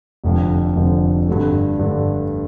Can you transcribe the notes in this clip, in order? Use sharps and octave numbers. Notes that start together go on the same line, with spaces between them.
F1 F2 D3 F3
F1 F2 D3 F3
G2 D3 A3
G2 D3 A3